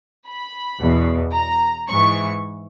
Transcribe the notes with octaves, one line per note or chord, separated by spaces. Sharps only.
B5
E2 B2
A#5
G#2 E3 C#6